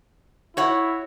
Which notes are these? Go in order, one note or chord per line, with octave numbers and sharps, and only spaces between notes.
E4 F#4 C#5 F#5